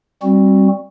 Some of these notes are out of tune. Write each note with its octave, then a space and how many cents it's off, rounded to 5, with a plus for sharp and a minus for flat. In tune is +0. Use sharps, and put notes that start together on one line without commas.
G3 +0 C4 +25 F#4 +0